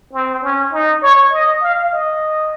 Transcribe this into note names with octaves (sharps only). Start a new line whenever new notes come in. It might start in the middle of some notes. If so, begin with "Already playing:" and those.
C4
C#4
D#4
C#5
D#5
F5
D#5